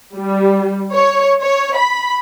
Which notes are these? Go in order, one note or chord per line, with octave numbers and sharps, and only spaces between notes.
G3
C#5
C#5
B5